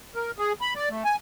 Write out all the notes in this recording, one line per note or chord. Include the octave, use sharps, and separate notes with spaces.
A#4
G#4
B5
D5
A3
G#5